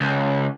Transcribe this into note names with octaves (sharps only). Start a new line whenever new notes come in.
C#2